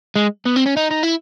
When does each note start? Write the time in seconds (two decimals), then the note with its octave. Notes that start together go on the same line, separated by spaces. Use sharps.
0.16 G#3
0.45 B3
0.56 C4
0.66 C#4
0.77 D#4
0.91 D#4
1.03 E4